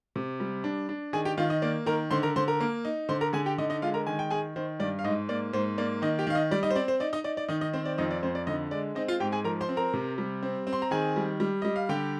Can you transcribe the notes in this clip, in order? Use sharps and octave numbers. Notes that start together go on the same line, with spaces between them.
C3
G3
D4
D4
D#3 G#4 G#5
G4 G5
D#3 F4 F5
D#4 D#5
A#3 D5
D#3 A#4 A#5
D3 C5 C6
A#4 A#5
D3 C5 C6
A#4 A#5
A#3
D#4
D3 C5 C6
A#4 A#5
D3 G#4 G#5
G4 G5
D3 D#4 D#5
D#4 D#5
G#3 F4 F5
A#4 A#5
D#3 G#5
G5
D#3 G#4 G#5
D#3 C5
G2 D5
F5
G#2 D#4 D#5
A#3 D5
G#2 C5
A#3 D5
D#3 D#4 D#5
G4 G5
D#3 F5
D#4 D#5
G3 D5
D#4 D#5
C5
C4 D5
C5
D#4 D5
D#4 D#5
D#4 D5
D5
D#3 D#4 D#5
D#4 D#5
C4 C5
D5
F2 D#4 D#5
D5
F2 C5
D5
D3 D#4 D#5
G#3 D5
C4 D#4 D#5
F4 F5
G#2 G4 G5
G#4 G#5
F3 A#4 A#5
C5 C6
C4
A#4 A#5
C3
G3
C4
C4
C6
A#5
D#3 G#4 G#5
G3
G3
G3 D#5
F5
D3 G4 G5